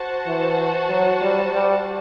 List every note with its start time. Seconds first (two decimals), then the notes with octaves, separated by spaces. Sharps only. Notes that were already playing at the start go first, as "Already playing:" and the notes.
Already playing: F#4 C5 F#5 A5
0.27 E3
0.89 F#3
1.21 G3
1.53 G3